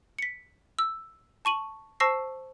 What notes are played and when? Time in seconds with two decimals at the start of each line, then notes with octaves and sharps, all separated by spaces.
0.18 B6 C#7
0.79 E6
1.45 A5 C#6 D#7 F#7
2.00 C5 A5 C#6 E6 A#6 C7